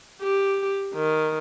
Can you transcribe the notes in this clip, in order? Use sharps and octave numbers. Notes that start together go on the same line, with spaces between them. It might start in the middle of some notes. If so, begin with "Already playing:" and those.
G4
D#3